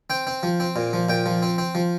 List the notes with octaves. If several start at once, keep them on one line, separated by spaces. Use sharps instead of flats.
C4 G5
C4
F3
C4
A#2
F3
A#2 G5
F3
C4
C4
F3